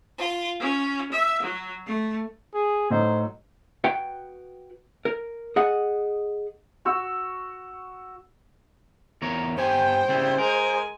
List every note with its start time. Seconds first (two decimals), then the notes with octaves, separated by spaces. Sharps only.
0.18 F4
0.60 C#4
1.11 E5
1.42 F#3
1.86 A3
2.54 G#4
2.90 A2 F#3 D#4 C5
3.84 F#4 B4 G5
5.05 A#4
5.56 G#4 D#5 F#5
6.85 F#4 C#6 E6
9.22 E2 A#4 C#5
9.57 G2 B3 C5 G5 G#5
10.08 C#3 G3 E4
10.38 G#3 A#4 G#5